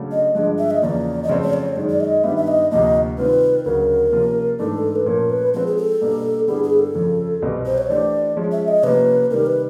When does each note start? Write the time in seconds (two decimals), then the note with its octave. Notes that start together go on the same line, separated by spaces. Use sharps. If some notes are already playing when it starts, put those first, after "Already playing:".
Already playing: C#3 F#3 A3 D4
0.12 D#5
0.35 G2 D3 F3 G#3 D#5
0.58 E5
0.71 D#5
0.82 E2 C#3 F3 A#3 D5
1.23 D#5
1.29 F2 C#3 F#3 A3 C4 D5
1.42 C#5
1.53 D5
1.68 C#5
1.76 F#2 D#3 G#3 D5
1.89 D5
2.00 D#5
2.24 G2 D#3 G3 B3 E5
2.37 E5
2.48 D#5
2.71 D2 C3 F3 A#3 D#5
3.18 C3 D#3 G3 C4 F4 B4
3.65 D2 C#3 F#3 A#4
4.12 C3 F3 A#3 C#4 F4
4.59 G#2 E3 A3 D4 A4
4.96 B4
5.06 A#2 F3 A3 C#4 A#4
5.30 B4
5.54 F3 G#3 C4 B4
5.67 G#4
5.77 A4
6.01 B2 G3 A#3 D4
6.48 G2 D3 G3 B3 E4 G#4
6.64 G#4
6.79 A4
6.95 F2 C#3 F3
7.42 C2 B2 G3 C4
7.66 C5
7.78 C#5
7.89 E3 A3 D4 G4 C5 D5
8.37 F3 G#3 C#4
8.52 E5
8.68 D#5
8.83 C3 F3 A#3 C#4 B4
9.31 C3 D#3 G3 A#4
9.46 B4